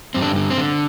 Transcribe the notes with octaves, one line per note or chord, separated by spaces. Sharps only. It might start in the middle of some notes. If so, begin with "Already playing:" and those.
G2 C4
D3 D4
D3
C4
D3